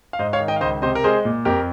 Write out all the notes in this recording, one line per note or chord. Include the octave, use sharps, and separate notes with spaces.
F5
G#2 C5 D#5
C#5 F5
D#3
D#5 G5
F5
C#2 C5 D#5
C3 C5 D#5
A#4
G#3 G#4 C5
A#2
F2 G4 A#4